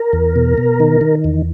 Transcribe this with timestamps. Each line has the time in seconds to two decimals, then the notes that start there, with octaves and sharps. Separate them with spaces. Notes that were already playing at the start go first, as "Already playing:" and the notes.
Already playing: A#4
0.13 E2
0.36 B2
0.58 B2
0.80 D#3
1.01 D#3
1.24 E2